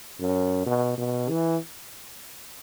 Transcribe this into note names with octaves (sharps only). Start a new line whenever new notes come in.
F#2
B2
B2
E3